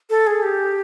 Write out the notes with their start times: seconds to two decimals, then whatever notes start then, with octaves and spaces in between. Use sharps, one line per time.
0.10 A4
0.27 G#4
0.43 G4